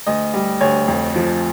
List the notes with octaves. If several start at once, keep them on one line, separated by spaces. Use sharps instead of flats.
D2 D#5
G3
D2 C#5
F2
F3